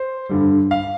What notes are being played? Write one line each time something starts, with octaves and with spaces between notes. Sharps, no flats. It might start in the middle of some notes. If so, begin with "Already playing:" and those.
Already playing: C5
G2 D3 G3
F5